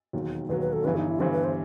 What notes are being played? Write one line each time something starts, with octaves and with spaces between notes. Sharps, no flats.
E1 D#2 D#3 F#3
E1 D#2 D#3 F#3 B4
B4
A4
G1 G2 E3 B4
D#4
E4
G1 G2 E3 C5
B4
C5